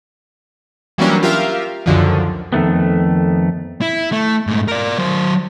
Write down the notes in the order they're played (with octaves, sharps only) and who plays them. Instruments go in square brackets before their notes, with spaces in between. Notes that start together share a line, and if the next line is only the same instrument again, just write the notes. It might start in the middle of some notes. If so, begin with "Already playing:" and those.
[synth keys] E3 F#3 G3 A#3 C#4 D4
F4 G4 A#4 E5 F5
C#2 F#2 D3 D#3 F3
[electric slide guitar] F2 D#3 A3 B3
[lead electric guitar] E4
A3
G#2 A3
A#4 D5
F#3 C5